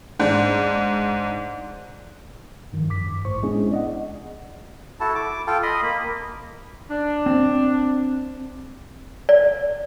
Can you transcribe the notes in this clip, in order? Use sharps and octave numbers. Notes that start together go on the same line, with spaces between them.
G#2 D4
G2 D#3 F3
F#2 D6 B6
G2
A1 A2 C5 C#6
G#3 B3 C#4 D4 E4 G#4
D5 D#5 F#5
E4 F#4 A4 A5
D6
F4 A4 G5
D#5 B5 C6 D#6
A#3 B5
D4
C4
D5